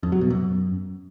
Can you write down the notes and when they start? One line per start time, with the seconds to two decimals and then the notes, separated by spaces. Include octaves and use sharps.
0.03 F2
0.12 F#3
0.21 B2
0.30 F#2